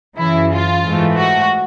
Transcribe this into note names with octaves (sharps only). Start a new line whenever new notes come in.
F#2 C#3 E3 E4
F4
G#2 E3 A3
F#4